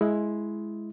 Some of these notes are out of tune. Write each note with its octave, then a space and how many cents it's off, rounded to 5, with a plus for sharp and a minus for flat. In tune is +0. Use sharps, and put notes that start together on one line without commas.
G#3 +15 E4 +5